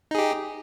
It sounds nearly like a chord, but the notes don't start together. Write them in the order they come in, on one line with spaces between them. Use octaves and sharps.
D#4 G#4 G4